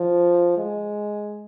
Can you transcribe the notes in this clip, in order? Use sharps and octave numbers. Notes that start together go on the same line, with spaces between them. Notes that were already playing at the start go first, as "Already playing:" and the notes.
Already playing: F3
G#3